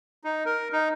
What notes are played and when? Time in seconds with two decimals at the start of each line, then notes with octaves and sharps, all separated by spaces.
0.24 D#4
0.46 A#4
0.73 D#4